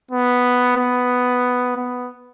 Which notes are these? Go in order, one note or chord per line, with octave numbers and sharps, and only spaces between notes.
B3
B3
B3